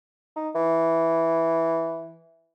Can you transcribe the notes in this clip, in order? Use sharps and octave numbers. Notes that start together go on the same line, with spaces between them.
D#4
E3